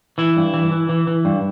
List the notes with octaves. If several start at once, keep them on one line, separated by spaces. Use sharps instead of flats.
E3 E4
G2
E3
E3
E3
E3
G2